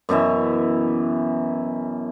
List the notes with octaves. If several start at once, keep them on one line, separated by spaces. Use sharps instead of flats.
F#2 B2 E3 E5